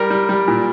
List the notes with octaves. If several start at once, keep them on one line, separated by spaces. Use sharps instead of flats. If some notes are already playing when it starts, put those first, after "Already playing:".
Already playing: G3 A#4
G3
G3
A#2